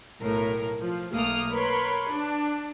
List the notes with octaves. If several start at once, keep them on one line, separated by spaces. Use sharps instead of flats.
B1 A2 A#4
F3
B1 A3 A#3 D#6 F6
A#4 B4 C#5 B5 C6
D4